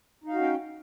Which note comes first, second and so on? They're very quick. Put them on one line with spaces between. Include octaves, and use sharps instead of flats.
D#4 F5 F#4 C#4 G5